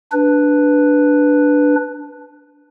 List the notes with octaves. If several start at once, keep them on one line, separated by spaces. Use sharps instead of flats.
D4 B4